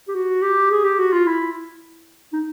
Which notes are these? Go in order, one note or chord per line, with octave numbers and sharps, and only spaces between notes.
G4
F#4
G4
G#4
G4
F#4
F4
E4
D#4